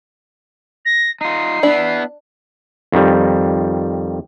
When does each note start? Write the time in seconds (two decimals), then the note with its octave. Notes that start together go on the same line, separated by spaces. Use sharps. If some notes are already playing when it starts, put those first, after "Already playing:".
0.85 A#6
1.21 D#4 F4 C7
1.63 B3 D4 E4
2.92 F2 D#3 G3